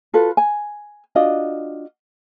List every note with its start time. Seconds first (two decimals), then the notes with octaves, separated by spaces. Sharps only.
0.14 F4 F#4 A4 B4
0.37 G#5
1.15 D4 F4 F#4 D#5